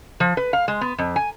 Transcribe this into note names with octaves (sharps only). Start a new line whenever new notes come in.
F3
B4
F5
G#3
B3
F2
G#5